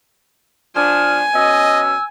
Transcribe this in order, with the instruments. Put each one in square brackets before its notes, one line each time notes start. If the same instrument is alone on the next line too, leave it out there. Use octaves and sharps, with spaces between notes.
[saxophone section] F3 D4 [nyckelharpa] G#5 [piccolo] F6
[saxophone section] B2 C#4 [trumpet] D#5 [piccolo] E6